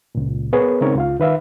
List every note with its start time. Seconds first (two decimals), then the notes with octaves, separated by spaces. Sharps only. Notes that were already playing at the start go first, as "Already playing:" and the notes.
0.15 C#2 A#2
0.53 B3 G#4 A#4 B4 C#5
0.81 C#3 G#3 C4 D#4 A#4 C#5
0.96 C#2 F4 F5
1.20 D#3 B4 E5 F5